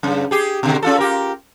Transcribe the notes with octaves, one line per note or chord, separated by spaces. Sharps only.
F#2 C#3
G4 G#4
B2 D3
C#4 F4 A4
F4 G4 A#4